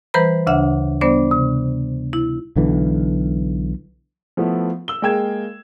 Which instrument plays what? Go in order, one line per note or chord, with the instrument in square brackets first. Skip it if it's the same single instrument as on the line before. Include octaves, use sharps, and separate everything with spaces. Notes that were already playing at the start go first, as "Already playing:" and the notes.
[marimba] E3 G3 B4 C5 A#5 B5
D2 C#3 D4 E5 F#5
G3 B3 D4 C5 D5
C3
E4
[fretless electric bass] B1 D3 E3
[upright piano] F3 A3 B3 E4
E6 G7
G#3 A#3 G5 G#6 E7